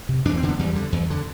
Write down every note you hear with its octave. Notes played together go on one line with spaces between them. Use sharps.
C3
E2 D4
C4
D3
B3
E2 G3
D3
E2
D3